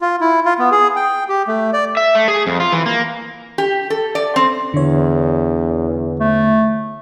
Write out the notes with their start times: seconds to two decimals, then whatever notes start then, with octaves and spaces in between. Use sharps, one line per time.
0.01 F4
0.21 E4
0.45 F4
0.59 B3
0.71 G#4
0.96 G5
1.29 G4
1.48 A3
1.73 D5
1.97 E5
2.15 A3
2.28 G#4
2.47 F2
2.60 F4
2.72 E3
2.86 A#3
3.58 G4
3.90 A4
4.15 D5
4.36 C4
4.74 E2 D3 C#5
6.20 A3